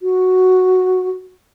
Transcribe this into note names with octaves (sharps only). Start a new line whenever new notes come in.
F#4